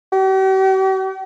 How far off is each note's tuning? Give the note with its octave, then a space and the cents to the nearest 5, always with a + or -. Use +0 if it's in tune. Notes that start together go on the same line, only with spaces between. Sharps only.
G4 -45